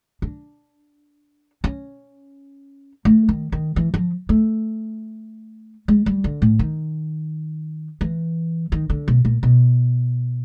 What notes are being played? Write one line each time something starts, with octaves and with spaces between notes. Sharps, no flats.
D4
C#4
A3
D#3
D#3
E3
F3
A3
G#3
G3
D3
A2
D#3
E3
D#3
D3
B2
A#2
B2